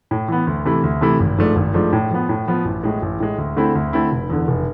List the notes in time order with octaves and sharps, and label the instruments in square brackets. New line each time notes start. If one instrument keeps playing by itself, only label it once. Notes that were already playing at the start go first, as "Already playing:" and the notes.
[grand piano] A2
E3 B3
D2
C3 E3 A3 E4
D2
C3 E3 A3 E4
G#1
G#2 F3 A3 D4
G#1
G#2 F3 A3 D4
A2
F3 B3
A2
F3 B3
A1
A2 G#3
A1
A2 G#3
D2
D3 A3 C4 E4
D2
D3 A3 C4 E4
F1
E2 D3
F1